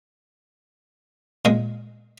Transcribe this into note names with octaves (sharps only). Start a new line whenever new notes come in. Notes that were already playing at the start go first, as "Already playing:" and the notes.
A#2 G#3